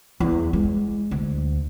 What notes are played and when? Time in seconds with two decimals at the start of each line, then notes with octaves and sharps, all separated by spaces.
0.20 E2
0.53 G#3
1.11 D2